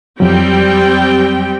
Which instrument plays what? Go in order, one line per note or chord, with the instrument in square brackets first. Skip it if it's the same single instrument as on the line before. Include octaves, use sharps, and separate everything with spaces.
[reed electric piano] F2 F#3 [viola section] G3 C4 G5